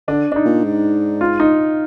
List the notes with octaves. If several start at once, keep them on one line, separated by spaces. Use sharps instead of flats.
D3 D4
D4
D#4
A#2
G#2
F4
D#4